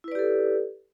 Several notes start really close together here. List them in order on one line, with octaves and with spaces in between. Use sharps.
E4 B4 D5 G4 A4